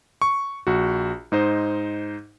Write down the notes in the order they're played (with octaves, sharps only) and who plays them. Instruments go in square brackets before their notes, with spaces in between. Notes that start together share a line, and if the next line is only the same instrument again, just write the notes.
[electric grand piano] C#6
A#1 F#4
G#2 D#4 C5 D#5